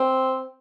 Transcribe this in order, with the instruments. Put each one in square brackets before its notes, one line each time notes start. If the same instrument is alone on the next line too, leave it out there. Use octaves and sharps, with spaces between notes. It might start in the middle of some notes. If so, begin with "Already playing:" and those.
Already playing: [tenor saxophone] C4